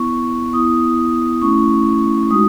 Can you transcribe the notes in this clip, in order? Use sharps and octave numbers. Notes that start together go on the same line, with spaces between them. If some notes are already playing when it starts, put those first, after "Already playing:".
Already playing: B3 E4 C#6
B3 E4 D#6
A3 C#4 E4 C#6
G#3 D#4 F#4 D#6